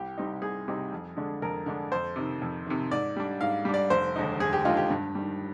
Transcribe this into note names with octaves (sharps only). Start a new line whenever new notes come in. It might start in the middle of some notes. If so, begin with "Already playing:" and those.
Already playing: C2 G4
C3 G3 C4 D#4
C2 G#4
C3 G3 C4 D#4
F2
D3 G#3 D4
F2 A#4
D3 G#3 D4
F2 C5
C3 D#3
F2
C3 D#3
G#2 D5
G3 D4
G#2 F5
G3 D4
D5
F1 C5
D#2 D3 G#3 D#4
F1 G#4
G4
D#2 D3 G#3 D#4 F4
G4
G2
D#3 G3